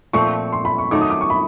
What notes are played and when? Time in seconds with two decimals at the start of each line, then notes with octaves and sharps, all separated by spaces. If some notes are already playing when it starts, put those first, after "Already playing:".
0.13 A#2 F3 A3 C4 C#6
0.52 C6
0.65 B5
0.78 C#6
0.91 D#3 F#3 A3 D6
1.01 D#6
1.10 D6
1.21 C#6
1.30 B5